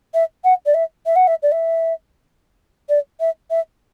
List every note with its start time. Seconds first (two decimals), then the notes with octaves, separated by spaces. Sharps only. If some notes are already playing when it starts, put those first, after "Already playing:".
0.14 E5
0.44 F#5
0.66 D5
0.74 E5
1.06 E5
1.16 F#5
1.27 E5
1.43 D5
1.52 E5
2.89 D5
3.20 E5
3.50 E5